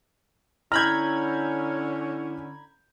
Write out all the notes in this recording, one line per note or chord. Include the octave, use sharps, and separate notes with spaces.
D3 C#4 E4 A#5 B5 F6 G6 G#6